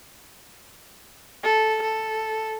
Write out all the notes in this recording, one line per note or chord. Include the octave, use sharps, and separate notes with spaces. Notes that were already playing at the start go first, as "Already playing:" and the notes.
A4
A4